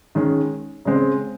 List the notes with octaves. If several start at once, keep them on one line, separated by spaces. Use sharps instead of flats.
D#3 G#3 C#4
C#3 G#3 C4